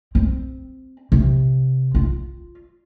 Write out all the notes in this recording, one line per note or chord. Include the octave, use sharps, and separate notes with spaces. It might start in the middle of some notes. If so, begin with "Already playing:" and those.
C4
C3
F4